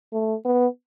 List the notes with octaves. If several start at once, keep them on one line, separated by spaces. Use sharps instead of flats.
A3
B3